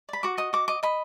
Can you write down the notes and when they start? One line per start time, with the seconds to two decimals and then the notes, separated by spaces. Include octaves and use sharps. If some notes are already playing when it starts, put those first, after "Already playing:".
0.09 D5 B5
0.23 F#4 D6
0.38 D#5 D#6
0.53 F#4 D6
0.68 D#5 D6
0.83 D#5 B5